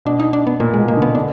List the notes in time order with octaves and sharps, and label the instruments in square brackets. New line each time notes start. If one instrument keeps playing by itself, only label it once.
[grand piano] B2 [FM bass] D4
[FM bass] D#4
D4
B3
[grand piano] A#2 [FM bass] A#3
[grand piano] B2 [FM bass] G#3
[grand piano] B2 [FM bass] A#3
[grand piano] D3
[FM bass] B3
[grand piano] D3 [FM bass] D4